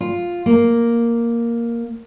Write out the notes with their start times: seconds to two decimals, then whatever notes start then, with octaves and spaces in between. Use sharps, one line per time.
0.01 F4
0.46 A#3